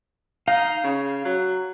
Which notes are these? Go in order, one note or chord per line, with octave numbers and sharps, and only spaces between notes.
D#4 F5
C#3
F#3